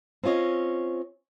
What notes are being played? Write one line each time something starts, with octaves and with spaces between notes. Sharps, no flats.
C4 C#4 F4 C#5 D#5